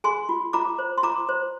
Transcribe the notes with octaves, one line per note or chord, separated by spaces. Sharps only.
G#4 G#5 C6
F4
F4 A#5 D6
C5
C6
F4 A#5 D6
C5